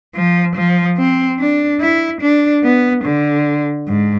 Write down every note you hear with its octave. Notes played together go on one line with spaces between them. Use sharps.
F3
F3
C4
D4
E4
D4
B3
D3
G#2